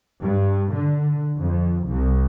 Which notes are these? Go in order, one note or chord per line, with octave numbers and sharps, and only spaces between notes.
G2
D3
F2
C2